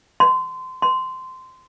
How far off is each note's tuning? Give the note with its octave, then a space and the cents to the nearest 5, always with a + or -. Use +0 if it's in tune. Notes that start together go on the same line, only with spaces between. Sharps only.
C6 -25
C6 -15